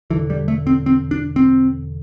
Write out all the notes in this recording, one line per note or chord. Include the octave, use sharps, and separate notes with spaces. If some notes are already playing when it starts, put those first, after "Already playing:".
E1 D2 D3 E3
G3
A3
C4
C4
D4
C4